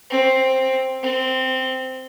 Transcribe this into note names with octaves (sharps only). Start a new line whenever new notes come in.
C4
C4